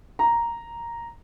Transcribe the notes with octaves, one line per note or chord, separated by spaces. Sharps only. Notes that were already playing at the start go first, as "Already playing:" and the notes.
A#5